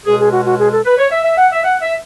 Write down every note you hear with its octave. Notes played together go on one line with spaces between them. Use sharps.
C#2 B2 G#3 G#4
G#4
F#4
F#4
G#4
A4
B4
C#5
E5
E5
F#5
E5
F#5
E5